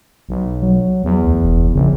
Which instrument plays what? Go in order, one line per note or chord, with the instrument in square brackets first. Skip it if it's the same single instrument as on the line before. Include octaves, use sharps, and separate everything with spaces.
[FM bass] B1
[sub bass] F#3
[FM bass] E2
[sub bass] D2
F1
[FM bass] A#1 [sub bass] C#3